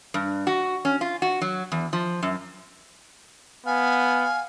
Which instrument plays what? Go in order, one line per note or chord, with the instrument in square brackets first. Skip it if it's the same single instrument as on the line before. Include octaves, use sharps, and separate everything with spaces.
[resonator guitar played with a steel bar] G2
F#4
C#4
F4
F#4
F#3
E2
F3
F#2
[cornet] B3 [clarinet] F5 [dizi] G#5